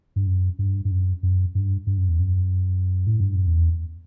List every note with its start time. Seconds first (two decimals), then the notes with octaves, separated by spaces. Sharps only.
0.16 G2
0.27 F#2
0.59 G2
0.85 G2
0.91 F#2
1.23 F#2
1.55 G2
1.87 G2
1.98 F#2
2.09 E2
2.19 F#2
3.07 A2
3.20 G2
3.34 F#2
3.47 E2